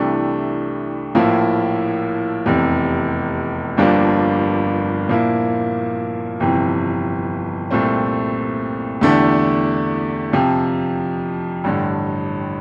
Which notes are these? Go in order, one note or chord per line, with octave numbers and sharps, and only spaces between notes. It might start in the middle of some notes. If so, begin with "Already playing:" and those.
Already playing: C2 C3 E3 A3 D4
A#1 A2 F3 A#3 E4
F1 E2 C3
G1 G2 F3 A#3 D4
A#2 F3 A#3 E4
G1 F2 C3 E3
C2 A#2 A3 C4
E2 D3 A3 D4 G4
F2 C3 F3
A1 G2 D3